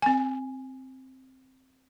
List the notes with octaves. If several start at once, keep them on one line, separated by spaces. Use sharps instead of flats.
C4 G#5